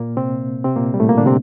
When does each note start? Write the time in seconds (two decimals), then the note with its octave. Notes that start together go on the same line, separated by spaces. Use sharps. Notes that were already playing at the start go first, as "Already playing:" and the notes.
Already playing: A#2 A#3
0.17 C3 C4
0.64 C3 C4
0.76 A#2 A#3
0.94 G3
1.00 A2 A3
1.09 A#2 A#3
1.18 D3 D4
1.26 C3 C4